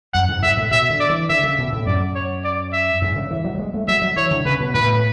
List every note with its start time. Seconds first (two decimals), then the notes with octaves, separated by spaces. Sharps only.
0.14 F#2 F#5
0.29 G#2
0.43 G#2 E5
0.57 A2
0.71 B2 E5
0.90 D3
1.00 D5
1.10 E3
1.29 D3 E5
1.44 C#3
1.58 B2
1.73 A2
1.86 F#2 D5
2.15 C#5
2.44 D5
2.73 E5
3.02 G#2
3.16 C#3
3.31 E3
3.44 F#3
3.55 F#3
3.59 G#3
3.74 A3
3.88 F#3 E5
4.02 F#3
4.16 E3 C#5
4.31 D3
4.45 C#3 B4
4.60 B2
4.74 A2 B4